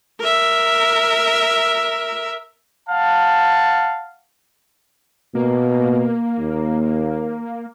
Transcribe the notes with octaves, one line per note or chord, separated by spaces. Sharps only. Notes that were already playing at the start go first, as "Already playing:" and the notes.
A#4 E5
F5 F#5 A5
B2 A#3
D#2